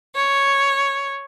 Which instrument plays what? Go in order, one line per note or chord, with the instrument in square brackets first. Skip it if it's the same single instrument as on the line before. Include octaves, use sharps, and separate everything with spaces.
[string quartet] C#5